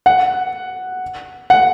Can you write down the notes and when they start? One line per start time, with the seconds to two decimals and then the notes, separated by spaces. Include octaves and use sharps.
0.06 F#5
1.50 F#5